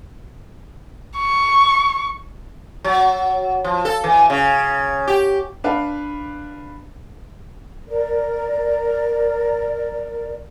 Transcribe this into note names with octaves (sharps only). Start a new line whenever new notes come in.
C#6
F#3
F3
A4
E3
C#3
G4
D4 B4 F5
A#4 D5